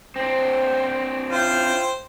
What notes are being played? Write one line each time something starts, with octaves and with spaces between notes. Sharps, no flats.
C4 D4 C5
C#4 E4 F4 C5 G5